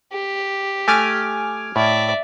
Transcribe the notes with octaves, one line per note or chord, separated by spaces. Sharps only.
G4
A3 G#5 D6 F6
A2 D5 E5